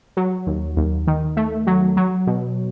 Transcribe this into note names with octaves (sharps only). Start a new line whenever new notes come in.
F#3
D#2
D#2
D#3
A3
F#3
F#3
B2